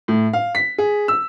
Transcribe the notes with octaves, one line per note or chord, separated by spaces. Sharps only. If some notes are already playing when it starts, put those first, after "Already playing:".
A2
F5
B6
G#4
E6